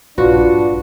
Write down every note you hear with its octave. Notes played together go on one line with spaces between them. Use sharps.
A#1 G2 D4 F4 F#4 B4 D5